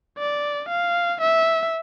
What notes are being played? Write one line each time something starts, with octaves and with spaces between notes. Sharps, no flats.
D5
F5
E5